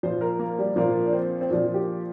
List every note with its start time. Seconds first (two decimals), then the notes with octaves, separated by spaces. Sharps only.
0.03 A#2 F3 C5
0.21 A#4
0.39 A#3
0.59 G3
0.76 A#2 F3 A#3
1.06 D4
1.13 C4
1.41 C4
1.50 A#2 F3 D4
1.74 G4